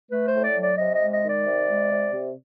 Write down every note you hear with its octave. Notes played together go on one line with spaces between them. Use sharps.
A3 B4
C5
A2
D5
F#3
D5
C3 D#5
G#3 D#5
D#5
D#3
D5
C3
G#3
C3
C3